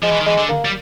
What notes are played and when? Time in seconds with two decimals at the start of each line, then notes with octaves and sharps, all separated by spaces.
0.03 F3 G#3
0.11 E3
0.20 D#3
0.26 E3 G#3
0.37 D3
0.49 A#3
0.65 G3